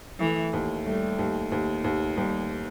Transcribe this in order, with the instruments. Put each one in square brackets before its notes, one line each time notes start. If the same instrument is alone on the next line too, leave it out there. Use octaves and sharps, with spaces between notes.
[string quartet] E3 [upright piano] A3
[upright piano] D#2
[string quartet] G3 [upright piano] A3
[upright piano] D#2
D#2
D#2
[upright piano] D#2 [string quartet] G3